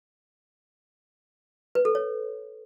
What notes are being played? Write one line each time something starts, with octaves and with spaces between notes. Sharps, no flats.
B4
A4
C#5